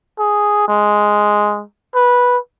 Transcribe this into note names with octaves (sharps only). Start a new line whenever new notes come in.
G#4
G#3
B4